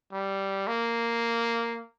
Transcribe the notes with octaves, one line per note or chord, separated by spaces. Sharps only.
G3
A#3